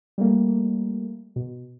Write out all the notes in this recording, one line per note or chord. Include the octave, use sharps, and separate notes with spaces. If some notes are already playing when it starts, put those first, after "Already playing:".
G3 A3 A#3
B2